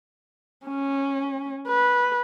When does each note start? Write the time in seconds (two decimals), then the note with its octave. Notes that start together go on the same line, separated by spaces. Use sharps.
0.67 C#4
1.68 B4